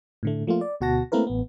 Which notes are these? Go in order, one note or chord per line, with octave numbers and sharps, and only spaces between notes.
A2 D3 A3
F3 A3 A#3 F4
D5
D2 B2 F#4 F#5 A5 A#6
A3 A#3 C4 E4 A#4 B4
A1 B3